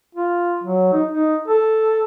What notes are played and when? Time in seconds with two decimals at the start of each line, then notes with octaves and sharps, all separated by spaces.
0.15 F4
0.64 F#3
0.93 D#4
1.11 D#4
1.48 A4